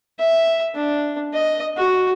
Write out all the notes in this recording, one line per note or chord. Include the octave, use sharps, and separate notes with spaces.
E5
D4
D#5
F#4